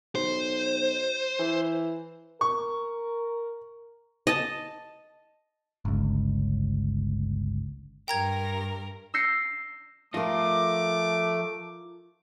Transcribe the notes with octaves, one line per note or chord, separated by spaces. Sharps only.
B1 C5
E3
A#4 C#6
D#5 A5
G1 C#2
G2 A#4 G5 A#5 G#6
E6 G6 A#6 C7 C#7
F3 A3 F4 A#4 D#5 D6